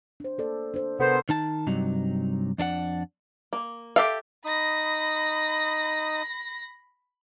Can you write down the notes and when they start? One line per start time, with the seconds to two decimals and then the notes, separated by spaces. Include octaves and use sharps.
0.20 D4 C5
0.38 A#3 A4 D5
0.74 D4 C5
0.99 C3 B3 A4 A#4 C5
1.29 D#3 D#4 A5
1.67 G2 C3 F#3 D#4
2.58 F2 D4 G#4 F#5
3.53 A#3
3.96 G4 A4 E5 F5
4.45 D#4 B5 D#6 A#6